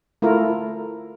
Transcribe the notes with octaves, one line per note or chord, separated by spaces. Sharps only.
A3 E4 F4 A#4